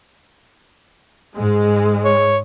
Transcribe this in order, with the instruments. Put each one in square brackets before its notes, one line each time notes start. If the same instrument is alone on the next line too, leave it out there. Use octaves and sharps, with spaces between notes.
[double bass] G#2 [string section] G#3
[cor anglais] C#5